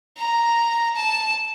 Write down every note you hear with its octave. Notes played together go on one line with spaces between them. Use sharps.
A#5
A5